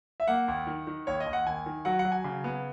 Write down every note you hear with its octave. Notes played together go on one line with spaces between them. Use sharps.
E5
A#3 F#5
D#2
D#3
D#3
D#2 C#5
D#5
D#2
F#5
D#2 G#5
D#3
F#3 F#5
F#5
F#3
G#5
C#3
B3